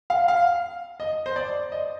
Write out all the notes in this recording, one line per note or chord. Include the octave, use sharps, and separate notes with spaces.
F5
F5
D#5
C5
D5
D#5